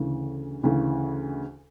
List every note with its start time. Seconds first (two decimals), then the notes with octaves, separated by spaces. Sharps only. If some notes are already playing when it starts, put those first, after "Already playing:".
Already playing: D2 C#3 E3
0.63 D2 C#3 E3